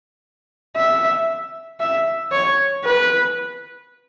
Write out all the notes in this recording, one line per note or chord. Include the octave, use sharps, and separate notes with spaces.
E5
E5
C#5
B4